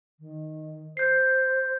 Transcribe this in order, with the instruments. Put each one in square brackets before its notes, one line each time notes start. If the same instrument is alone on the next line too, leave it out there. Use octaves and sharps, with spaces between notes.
[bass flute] D#3
[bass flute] C5 [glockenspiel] G6 C7